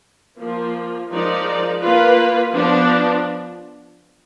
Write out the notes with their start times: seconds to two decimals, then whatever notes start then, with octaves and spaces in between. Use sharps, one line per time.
0.38 F3 A#3 F4
1.09 F3 G#3 D#4 A#4 D5
1.81 A#3 F4 B4
2.52 F3 B3 D4